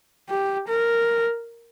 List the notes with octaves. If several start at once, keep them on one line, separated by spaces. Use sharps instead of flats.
G4
A#4